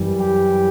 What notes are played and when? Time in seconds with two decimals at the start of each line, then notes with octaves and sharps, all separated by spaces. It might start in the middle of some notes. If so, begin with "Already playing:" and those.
Already playing: F#2 E3 G3
0.19 G4